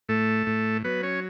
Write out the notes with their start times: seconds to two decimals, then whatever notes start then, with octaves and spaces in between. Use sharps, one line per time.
0.09 A2 A3 A4
0.47 A2
0.84 F#3 B3 B4
1.03 C#4 C#5